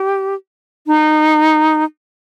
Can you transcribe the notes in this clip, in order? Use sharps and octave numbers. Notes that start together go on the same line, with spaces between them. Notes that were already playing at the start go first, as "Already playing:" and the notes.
Already playing: G4
D#4